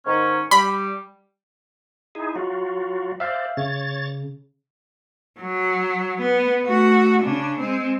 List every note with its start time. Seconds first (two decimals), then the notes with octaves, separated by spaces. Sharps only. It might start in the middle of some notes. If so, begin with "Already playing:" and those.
0.06 G#2 D#3 C#4
0.51 G3 B5
2.15 D#4 E4 G#4
2.36 F#3 F4 F#4
3.20 C5 D5 E5 F5
3.57 C#3 C#5 A6
5.39 F#3
6.21 B3
6.65 A3 F#4
7.22 C#3 D4
7.60 G#3 C4